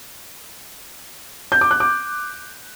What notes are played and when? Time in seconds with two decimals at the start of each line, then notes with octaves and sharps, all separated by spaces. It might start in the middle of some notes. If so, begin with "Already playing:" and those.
1.52 G6
1.61 D6
1.71 F#6
1.80 D6